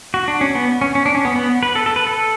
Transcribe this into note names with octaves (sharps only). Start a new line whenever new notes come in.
F#4
D4
C#4
B3
C#4
C#4
D4
C#4
B3
B3
B4
A4
A4
B4
A4